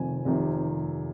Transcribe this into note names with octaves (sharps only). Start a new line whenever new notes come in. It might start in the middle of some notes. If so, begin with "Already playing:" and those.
Already playing: F1 F2 C3 D#3 G#5
F1 F2 C3 D#3